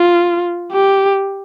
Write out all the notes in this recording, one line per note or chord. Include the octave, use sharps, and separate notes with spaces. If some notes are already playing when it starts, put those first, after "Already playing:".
Already playing: F4
G4